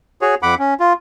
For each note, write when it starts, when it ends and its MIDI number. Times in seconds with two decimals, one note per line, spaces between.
0.22 0.35 66
0.22 0.35 68
0.22 0.35 73
0.43 0.55 41
0.43 0.55 78
0.43 0.55 83
0.43 0.55 86
0.59 0.74 61
0.80 0.93 65